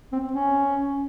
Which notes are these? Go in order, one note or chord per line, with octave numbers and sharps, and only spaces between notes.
C4
C#4